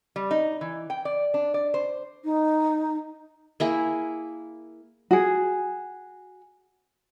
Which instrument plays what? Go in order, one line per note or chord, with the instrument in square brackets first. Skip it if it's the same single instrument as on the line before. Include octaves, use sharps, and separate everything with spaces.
[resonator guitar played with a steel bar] G3
D#4
E3
G5
D5
D4
D5
C5
[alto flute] D#4
[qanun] A#3 E4 G#4
[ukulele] F#4 G#4